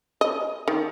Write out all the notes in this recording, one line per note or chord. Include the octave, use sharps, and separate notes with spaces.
D#5
D#3